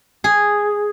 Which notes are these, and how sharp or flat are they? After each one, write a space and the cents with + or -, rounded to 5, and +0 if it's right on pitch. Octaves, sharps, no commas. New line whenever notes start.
G#4 -5